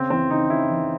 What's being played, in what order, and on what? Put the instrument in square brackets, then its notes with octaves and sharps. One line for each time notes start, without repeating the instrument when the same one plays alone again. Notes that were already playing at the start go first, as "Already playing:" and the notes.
Already playing: [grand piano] C#3 C4
E3 C4
C#3 D#4
C#3 E4
E3